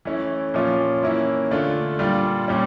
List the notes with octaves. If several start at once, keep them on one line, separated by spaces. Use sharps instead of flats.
E3 A3 C#4 E4
A#2 F3 C#4 F4
E3 A#3 C#4 E4
D3 A3 D4 F4
A#2 G3 D4 F4
A#2 G3 C#4